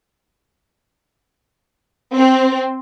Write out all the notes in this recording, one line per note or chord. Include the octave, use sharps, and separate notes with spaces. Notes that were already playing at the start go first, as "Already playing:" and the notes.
C4